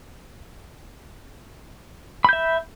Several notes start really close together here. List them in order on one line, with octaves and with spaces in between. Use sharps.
B5 G6 E5